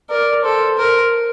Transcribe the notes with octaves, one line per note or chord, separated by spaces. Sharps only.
A#4 D5
A4 C5
A#4